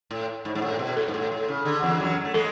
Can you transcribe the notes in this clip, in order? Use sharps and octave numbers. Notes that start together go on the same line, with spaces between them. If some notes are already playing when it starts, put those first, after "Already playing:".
A2
G#2
G#2
A2
B2
A4
G#2
A2
A2
C#3
D3
E2 E3
F#2 F#3
A3
G#3 A4